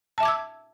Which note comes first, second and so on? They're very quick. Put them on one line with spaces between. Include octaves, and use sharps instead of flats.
A5 E5 D6 G#6 E6